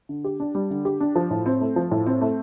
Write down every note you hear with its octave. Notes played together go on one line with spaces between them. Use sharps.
D3
G4
D4
G3
D3
G4
D4
F3
A2
C4
A3
F3
A2
C4
A3